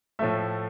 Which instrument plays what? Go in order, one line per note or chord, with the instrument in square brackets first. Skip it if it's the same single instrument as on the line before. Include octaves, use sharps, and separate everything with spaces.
[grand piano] A2 F3 A3 E5